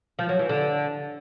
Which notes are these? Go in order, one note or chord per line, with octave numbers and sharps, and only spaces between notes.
F3
F#3
E3
D3